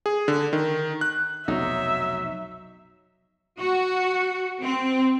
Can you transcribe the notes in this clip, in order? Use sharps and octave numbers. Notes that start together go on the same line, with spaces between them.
G#4
D3
D#3
F#6
F1 B1 F#3 D#4 E5
F#4
C4